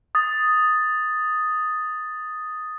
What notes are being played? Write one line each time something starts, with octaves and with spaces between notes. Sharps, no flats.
D#6 A6